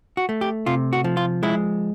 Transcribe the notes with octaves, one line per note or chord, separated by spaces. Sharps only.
F#4
A3
G4
C3 F4
F#4
F3
F4
G#3 E4